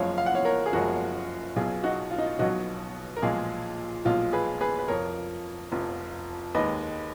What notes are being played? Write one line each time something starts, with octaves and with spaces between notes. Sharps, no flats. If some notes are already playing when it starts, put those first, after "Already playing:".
Already playing: F#1 F#2 F3 G#3 C#5 F5
F5
F#5
C#5 F5
A#4 C#5
G#4
F#1 F#2 F3 G#3 F#4 A#4
B1 B2 F#3 F4 G#4
D#4 F#4
F4
D#4
F4
B1 B2 F#3 D#4 F#4
A#4
B1 A#2 F3 G#3 F4 G#4
B1 A#2 F3 G#3 F4
G#4 B4
G#4 B4
B4
F1 F2 F3 A#4 C#5
F1 F2 F3
D#2 D#3 G#3 B4 D#5